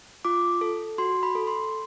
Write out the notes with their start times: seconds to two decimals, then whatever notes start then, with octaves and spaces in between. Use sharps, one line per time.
0.25 F4 D6
0.61 A4
0.98 F#4 C6
1.23 B5
1.35 A4
1.47 C6